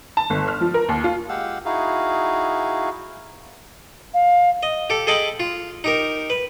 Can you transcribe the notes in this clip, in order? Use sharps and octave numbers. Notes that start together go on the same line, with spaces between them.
A5
G1
F6
F3
A#4
D#2
F4
G#3 G4 F5 F#5 E6
D#4 E4 F#4 G#4 F5
F5
D#5
G4 A4
G#4 A4 D#5 G5 A5 B5
F4
D#4 G4 A#4
B4